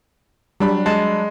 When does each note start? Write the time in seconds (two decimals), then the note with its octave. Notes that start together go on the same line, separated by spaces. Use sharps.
0.60 F#3 G3 D4 B5
0.86 G#3 A5